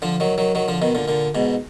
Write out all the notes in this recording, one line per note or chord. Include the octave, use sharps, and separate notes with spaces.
D3 F3
D#3 F#3
D#3 F#3
D#3 F#3
D3 F3
B2 D#3
A#2 D3
A#2 D3
G#2 B2